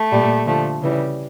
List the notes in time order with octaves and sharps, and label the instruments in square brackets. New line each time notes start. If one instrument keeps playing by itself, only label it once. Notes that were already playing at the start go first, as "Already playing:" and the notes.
Already playing: [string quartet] A3
A#2 G3
D3 F3 A3
C#3 E3 G3